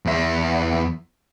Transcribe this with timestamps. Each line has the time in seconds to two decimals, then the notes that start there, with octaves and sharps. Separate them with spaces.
0.06 E2 E5